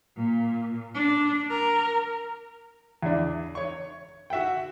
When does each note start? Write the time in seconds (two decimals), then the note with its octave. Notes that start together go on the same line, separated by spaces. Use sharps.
0.16 A#2
0.94 D4
1.50 A#4
3.03 E2 D4
3.55 C#5 C#6
4.30 F#4 E5 F#5 G5